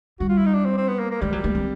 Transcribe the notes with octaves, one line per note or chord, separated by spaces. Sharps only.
G3 F#4
F4
E4
D#4
D4
C4
C4
B3
A#3
A#3
G3 G#3
F#3
A3
C4